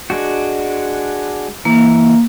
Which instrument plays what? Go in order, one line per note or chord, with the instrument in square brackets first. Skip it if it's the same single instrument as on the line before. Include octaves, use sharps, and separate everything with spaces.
[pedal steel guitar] G#3 D4 F#4
[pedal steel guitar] E3 [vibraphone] A#3